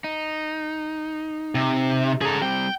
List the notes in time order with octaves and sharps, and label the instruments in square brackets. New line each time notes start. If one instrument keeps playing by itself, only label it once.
[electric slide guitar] D#4
[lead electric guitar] C3
[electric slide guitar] C#3 A4 [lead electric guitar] G#4 A#5
[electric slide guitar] G3 C4 [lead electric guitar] G5